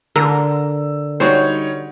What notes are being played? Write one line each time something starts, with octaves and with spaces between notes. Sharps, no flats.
D3 A#4 E6
G3 D#4 F#4 C5 C#5